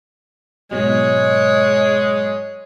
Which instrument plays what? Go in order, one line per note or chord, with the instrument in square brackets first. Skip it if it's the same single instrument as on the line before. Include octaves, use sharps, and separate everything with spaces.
[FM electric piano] G#2 B2 F#3 [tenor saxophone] G#3 [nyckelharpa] C#5